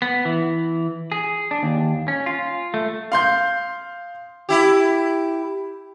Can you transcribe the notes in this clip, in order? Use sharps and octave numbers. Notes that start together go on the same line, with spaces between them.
B3
E3
G#4
D4
D#2
C#4
F4
A3
F5 C6 G6
E4 G4